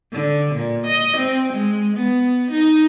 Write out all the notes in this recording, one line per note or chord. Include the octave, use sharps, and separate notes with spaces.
D3
A#2
D#5
C4
G#3
B3
D#4